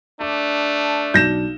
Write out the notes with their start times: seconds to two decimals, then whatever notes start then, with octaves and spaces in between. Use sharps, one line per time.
0.21 A3 D4 D6
1.14 B1 G6 A#6 E7